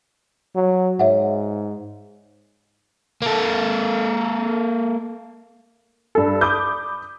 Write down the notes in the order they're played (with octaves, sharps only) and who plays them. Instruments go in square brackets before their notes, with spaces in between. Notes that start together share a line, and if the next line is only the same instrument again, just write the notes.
[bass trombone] F#3
[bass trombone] G#2 [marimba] C#5 E5 F#5
[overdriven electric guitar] A#3 A4
[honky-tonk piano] G2 A4
B5 D6 D#6 G6